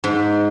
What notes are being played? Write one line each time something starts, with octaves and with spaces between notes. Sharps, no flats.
G#2